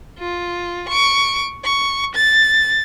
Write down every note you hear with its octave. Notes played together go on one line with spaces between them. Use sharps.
F4
C#6 D7
C#6
A6